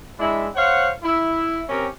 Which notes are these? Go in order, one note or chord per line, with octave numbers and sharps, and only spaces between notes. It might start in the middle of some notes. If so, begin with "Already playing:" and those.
G#3 D4 E4
C5 C#5 F5 F#5
E4
C4 C#4 G4 A#4